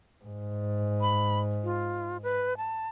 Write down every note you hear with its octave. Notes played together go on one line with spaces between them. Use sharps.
G#2
B5
F4
B4
A5